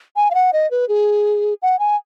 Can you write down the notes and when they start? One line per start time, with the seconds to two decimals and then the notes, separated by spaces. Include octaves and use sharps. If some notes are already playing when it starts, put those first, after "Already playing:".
0.16 G#5
0.31 F5
0.34 F#5
0.53 D#5
0.71 B4
0.89 G#4
1.62 F#5
1.79 G#5